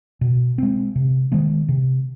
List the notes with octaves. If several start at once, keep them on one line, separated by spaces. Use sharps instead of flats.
B2
G#3 C4
C3
D#3 G#3 B3
C3